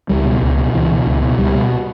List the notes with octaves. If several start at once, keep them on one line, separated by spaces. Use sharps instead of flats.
C#2 G3
B2
C#2
B2
C#2 E3
B2
C#2
B2
C#2 G3
B2